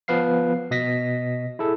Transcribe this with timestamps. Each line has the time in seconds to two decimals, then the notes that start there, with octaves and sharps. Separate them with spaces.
0.08 F3 B3 B4 F5 C7
0.71 B2 D#5 A#6 B6
1.59 E4 G#4 A4